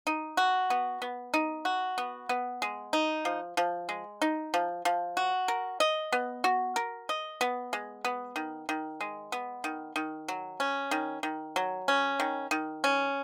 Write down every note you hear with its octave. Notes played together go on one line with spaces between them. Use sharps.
D#4
F#4
B3
B3
D#4
F#4
B3
B3
G#3
D#4
F3
F3
G#3
D#4
F3
F3
F#4
A#4
D#5
B3
F#4
A#4
D#5
B3
G#3
B3
D#3
D#3
G#3
B3
D#3
D#3
F#3
C#4
D#3
D#3
F#3
C#4
D#3
D#3
C#4